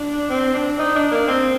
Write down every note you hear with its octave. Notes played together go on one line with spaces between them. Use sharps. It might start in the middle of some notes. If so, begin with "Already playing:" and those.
Already playing: D4
C4
D4
D#4
D4
A#3
C4